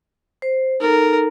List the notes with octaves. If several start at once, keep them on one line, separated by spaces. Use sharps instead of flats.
C5
D#4 A4 A#4